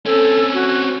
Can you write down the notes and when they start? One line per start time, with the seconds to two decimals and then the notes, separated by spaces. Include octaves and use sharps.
0.06 C4 C#4 A4
0.54 F#4